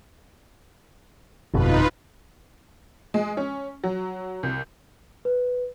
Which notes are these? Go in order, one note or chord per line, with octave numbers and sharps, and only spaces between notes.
G1 F2 B2 D#4 F4 B4
G#3
C#4
F#3
C2
B4